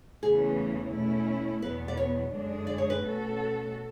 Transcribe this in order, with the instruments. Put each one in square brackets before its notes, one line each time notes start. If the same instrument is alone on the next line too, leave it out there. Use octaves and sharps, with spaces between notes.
[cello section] E2 C#3 E3 A3 C#4 [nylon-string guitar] G#4
[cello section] B2 A3 C#4 E4
[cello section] E2 B2 F#3 B3 [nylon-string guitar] B4
[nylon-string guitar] D5
C#5
[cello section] F#2 D3 G#3 D4 G#4
[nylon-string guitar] D5
C#5
B4
[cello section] B2 A3 C#4 F#4 A4